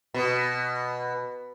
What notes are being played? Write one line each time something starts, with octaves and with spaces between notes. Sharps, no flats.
B2